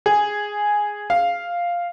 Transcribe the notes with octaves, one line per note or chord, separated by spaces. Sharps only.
G#4
F5